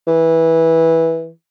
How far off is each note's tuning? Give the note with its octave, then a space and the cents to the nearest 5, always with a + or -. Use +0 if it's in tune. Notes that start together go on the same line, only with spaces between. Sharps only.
E3 -10